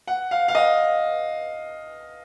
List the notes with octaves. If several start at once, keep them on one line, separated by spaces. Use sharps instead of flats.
F#5
F5
F5
D#5